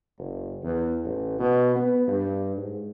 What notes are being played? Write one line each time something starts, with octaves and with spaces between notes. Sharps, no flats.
F#1
E2
A1
B2
B3
G2
G#2